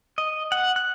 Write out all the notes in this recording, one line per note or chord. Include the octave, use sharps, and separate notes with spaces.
D#5
F#5
F#6